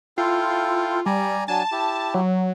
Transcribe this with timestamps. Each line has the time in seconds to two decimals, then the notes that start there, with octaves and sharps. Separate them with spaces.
0.18 E4 F4 A4 G5
1.06 G3 D5 G#5 A#5
1.48 F#3 D4 G#5 A5
1.72 E4 G4
2.14 F#3